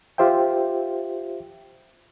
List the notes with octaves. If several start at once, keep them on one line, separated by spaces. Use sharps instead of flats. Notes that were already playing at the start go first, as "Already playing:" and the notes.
F4 G4 C5 E5 G5